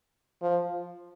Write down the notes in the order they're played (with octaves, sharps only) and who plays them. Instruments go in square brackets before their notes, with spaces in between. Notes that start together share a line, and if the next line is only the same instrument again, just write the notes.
[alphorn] F3